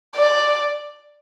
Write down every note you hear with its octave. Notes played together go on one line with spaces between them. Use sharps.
D5